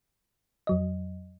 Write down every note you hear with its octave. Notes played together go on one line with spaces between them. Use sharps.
F2 F#3 D#5